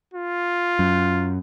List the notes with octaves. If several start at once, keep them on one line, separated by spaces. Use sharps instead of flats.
F4
F#2